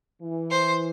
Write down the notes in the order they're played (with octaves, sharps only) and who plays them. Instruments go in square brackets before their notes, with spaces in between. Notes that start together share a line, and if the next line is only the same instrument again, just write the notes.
[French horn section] E3
[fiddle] C5